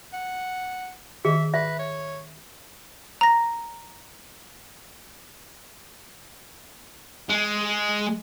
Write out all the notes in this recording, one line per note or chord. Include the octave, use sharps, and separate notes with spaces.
F#5
D#3 G#4 D#5 E5 C#6
B4 E5
C#5
A#5 A#6
G#3